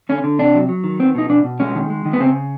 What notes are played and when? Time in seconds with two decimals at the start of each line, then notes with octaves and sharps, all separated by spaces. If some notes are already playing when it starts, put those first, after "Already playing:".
0.09 D3 C#4
0.24 D3
0.39 C3 D4
0.55 F#3
0.69 F#3
0.84 D#3
0.99 B3 C4
1.15 B2 D#4
1.30 B2 D4
1.44 B2
1.60 G#3 C#4
1.75 D#3
1.90 G#3
2.06 D#3
2.13 B3
2.20 C#3 C4